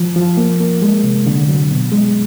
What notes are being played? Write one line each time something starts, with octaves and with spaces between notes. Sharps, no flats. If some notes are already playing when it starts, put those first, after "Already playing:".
Already playing: F3
F3
A#3
A#3
G#3
C3
D3
F#3
B2
G#3